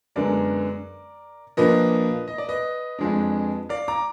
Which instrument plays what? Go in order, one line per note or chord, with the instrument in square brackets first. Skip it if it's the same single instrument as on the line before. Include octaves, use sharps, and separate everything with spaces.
[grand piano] F#2 D3 G#3 B3 A#4 D5
A#2 F3 A#3 D4 B4 D#5
D#5
D5
B4 D#5
F2 F3 G#3 D4
D5 F5
A#5 D6